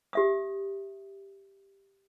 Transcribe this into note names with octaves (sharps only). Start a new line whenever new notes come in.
G4 E5 D#6